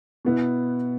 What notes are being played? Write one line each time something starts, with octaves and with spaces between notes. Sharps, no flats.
B2 B3 E4